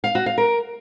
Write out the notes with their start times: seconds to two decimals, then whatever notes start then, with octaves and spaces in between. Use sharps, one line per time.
0.04 F5
0.15 F#4
0.26 F5
0.38 A#4